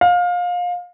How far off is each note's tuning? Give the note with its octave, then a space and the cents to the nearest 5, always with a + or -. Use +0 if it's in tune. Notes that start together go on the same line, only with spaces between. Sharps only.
F5 +25